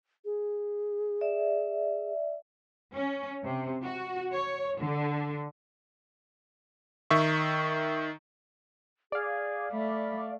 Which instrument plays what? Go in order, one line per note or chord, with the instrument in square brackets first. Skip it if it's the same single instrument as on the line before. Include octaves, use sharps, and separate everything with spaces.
[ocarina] G#4
[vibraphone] D5 E5
[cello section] C#4
C3
F#4
C#5
D3
[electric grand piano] D#3 E5 C#6
[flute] G#4 [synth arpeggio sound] D5 F5
[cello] A3 [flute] B5